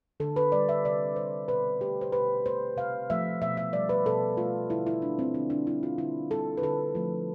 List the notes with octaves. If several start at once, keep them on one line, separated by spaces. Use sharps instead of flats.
D3 A4
B4
G3 D5
E5
C3 D5
G3 C5
B2 B4
A3 G4
C5
B2 B4
A3 C5
C3 F5
F3 A3 E5
B2 E5
E5
G3 D5
B4
B2 A4
A3 F4
D3 E4
E4
G3 D4
C4
D3 D4
D4
G3 E4
F4
D3 E4
G3 A4
B4
D3 A4
F3 A3